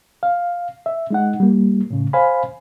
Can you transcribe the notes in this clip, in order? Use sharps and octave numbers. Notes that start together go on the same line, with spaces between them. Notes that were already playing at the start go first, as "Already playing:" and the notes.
F5
E5
G#3 D#4 F#5
G3 A#3
A2 C#3
C5 F5 G#5 B5